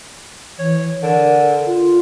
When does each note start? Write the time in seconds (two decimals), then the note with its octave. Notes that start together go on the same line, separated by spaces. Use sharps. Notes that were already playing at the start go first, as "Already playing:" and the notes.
0.59 E3 C#5
1.03 D3 A#4
1.67 F4